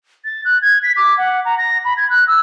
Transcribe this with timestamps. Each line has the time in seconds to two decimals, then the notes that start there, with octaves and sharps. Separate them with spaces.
0.25 A6
0.45 F#6
0.62 G#6
0.83 B6
0.97 D6
1.18 F#5
1.45 A#5
1.58 A#6
1.85 B5
1.97 G#6
2.10 F#6
2.27 E6